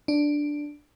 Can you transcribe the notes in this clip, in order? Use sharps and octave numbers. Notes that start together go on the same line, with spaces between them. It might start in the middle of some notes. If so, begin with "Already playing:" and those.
D4